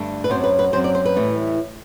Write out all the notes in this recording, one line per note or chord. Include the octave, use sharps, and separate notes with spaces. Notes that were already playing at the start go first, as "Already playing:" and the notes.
Already playing: G2 D3 A3 D4
B4
F#2 F#3 C4 C5
B4
B4
F#2 F#3 C4 C5
D5
C5
B4
A2 E3 G3